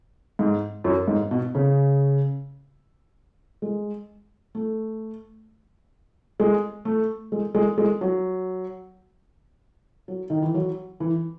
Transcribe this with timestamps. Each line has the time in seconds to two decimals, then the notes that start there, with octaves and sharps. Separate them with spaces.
0.39 G#2
0.84 F#2
1.08 G#2
1.31 B2
1.55 C#3
3.62 G#3
4.55 A3
6.40 G#3
6.85 A3
7.32 G#3
7.55 G#3
7.78 G#3
8.01 F#3
10.08 F#3
10.30 D#3
10.42 E3
10.54 F#3
11.00 E3